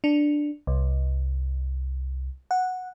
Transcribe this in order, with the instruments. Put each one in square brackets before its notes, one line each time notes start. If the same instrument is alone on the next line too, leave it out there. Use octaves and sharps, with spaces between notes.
[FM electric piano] D4
C2
F#5